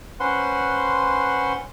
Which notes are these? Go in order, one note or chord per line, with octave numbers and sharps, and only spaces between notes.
C#4 B4 C5 F#5 C6